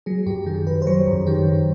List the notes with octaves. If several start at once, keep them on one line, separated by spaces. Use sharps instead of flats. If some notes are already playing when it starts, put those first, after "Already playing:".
F#3 G#4
F#2 G4
D#3 G#4
F#2 B4
C5
F#3 C#5
F#2
D#3 G4
F#2